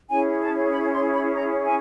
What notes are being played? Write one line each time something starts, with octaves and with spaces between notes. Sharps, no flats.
C#4 E4 G#4 C#5 G#5
A5
B5
C6
B5
A#5
G#5